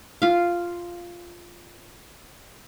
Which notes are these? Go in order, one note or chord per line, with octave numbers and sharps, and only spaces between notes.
F4 F5